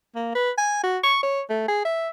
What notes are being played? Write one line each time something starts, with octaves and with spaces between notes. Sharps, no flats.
A#3
B4
G#5
F#4
C#6
C#5
A3
G#4
E5